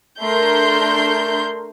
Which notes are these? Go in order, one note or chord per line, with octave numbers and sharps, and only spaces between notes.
A3 D4 A#4 C6 G6